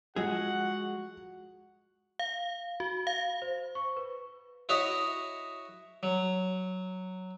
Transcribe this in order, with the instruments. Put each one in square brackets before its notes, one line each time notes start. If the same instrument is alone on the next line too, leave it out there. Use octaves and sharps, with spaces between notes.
[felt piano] F3 [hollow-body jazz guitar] G#3 G#4 [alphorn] F#4 [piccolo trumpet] F#5
[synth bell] F5
F#4
F5
[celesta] C5
C#6
B4
[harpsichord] E4 F#4 C#5 D#5 E5
F#3